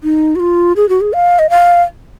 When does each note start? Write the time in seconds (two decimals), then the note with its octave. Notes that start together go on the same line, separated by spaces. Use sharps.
0.03 D#4
0.36 F#4
0.40 F4
0.76 G#4
0.89 F#4
1.01 G#4
1.13 F5
1.39 D#5
1.50 F5